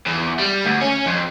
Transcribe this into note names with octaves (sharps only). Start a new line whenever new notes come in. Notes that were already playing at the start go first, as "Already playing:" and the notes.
E2
G3
D2
C#4
F2